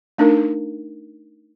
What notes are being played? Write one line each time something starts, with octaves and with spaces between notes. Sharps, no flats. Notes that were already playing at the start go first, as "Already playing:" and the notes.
A3 D4 D#4 A#4